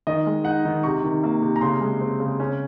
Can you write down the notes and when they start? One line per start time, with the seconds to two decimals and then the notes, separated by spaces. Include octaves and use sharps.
0.07 D#3 D#5
0.26 G#3
0.45 D#4 F#5
0.65 D#3
0.83 C3 C#6
1.03 D#3
1.23 A#3
1.42 C3
1.56 A#5
1.61 C#3 C6
1.81 G#3
2.01 C4
2.20 C#3
2.40 C#4